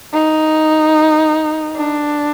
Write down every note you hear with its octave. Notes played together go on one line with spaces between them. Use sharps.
D#4
D4